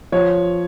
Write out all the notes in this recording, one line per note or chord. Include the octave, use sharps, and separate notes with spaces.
F3 C#5